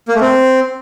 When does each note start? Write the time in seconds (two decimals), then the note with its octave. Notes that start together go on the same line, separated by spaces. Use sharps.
0.08 A#3
0.15 A3
0.21 C4